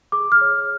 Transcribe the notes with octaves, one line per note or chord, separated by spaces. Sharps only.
G#4 D6
F6
C#5